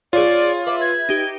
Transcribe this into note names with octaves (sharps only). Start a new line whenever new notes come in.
F4 G#4 C#5 D5
B4 E5 D6
G#6
D#4 G4